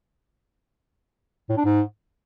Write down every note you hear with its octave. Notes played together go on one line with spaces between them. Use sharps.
A2
D4
G#2